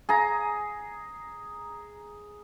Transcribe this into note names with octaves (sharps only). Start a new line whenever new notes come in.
G#4 A#5